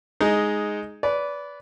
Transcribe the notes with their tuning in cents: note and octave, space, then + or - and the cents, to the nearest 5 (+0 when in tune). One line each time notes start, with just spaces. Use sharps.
G#3 +5 D#4 +0
B4 +0 D5 -25